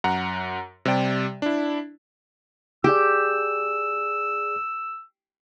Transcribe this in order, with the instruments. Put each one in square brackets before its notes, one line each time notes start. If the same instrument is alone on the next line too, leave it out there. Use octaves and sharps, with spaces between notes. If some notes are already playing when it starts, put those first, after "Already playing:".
[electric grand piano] F#2 F#5 A#5
C3 G3 G4 D5 G5
D4 E4
[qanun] G4 [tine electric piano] G#4 D5 [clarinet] E6